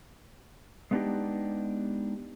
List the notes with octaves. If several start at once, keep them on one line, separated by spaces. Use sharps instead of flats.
G#3 A3 B3 D4 D#4 G4